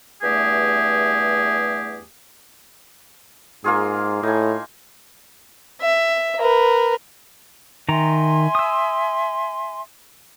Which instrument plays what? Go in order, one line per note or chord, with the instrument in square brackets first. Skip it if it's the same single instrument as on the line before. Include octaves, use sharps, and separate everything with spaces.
[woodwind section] E2 G2 A3 G4 G#4
[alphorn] G#2 [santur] A#3 F4 G#4
[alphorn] A2 [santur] D#4 G#5
[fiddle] E5
A#4 B4
[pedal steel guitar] D#3 A#5 [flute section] E5 G#5 C6
[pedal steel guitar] D#6 E6